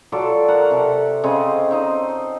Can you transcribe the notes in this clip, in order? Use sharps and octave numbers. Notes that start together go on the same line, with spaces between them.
F#3 F4 A4 D5
A#4 F#5
C3 A4
C#3 C4 D#5
C4 D#4 D#5